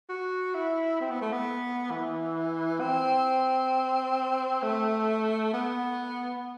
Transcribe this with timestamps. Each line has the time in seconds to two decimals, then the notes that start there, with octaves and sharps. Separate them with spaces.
0.09 F#4
0.55 E4
1.00 C4
1.10 B3
1.21 A3
1.32 B3
1.91 E3
2.81 C4
4.62 A3
5.53 B3